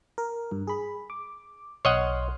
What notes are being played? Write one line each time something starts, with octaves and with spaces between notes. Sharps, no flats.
A#4
G2
G#4 B5
D6
B1 C#5 D#5 F#5 C6 F6